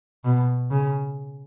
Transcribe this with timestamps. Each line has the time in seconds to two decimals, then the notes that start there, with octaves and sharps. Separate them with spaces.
0.25 B2
0.71 C#3